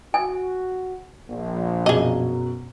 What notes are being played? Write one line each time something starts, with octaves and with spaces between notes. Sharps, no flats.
F#4 G#5
A#1
F#2 B2 F#3 G#4 D#5